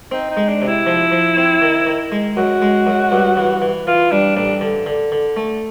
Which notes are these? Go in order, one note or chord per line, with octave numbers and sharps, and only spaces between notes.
C4 D#4
D#4
G#3
D4
C3
E4
F3
F3
C4
D#3
D#3
G#3
F#2 F#4
G#3
F#2
G2
E3
E3
E3 F4
G3 D4
A1 D4
D3
D3
D3
A3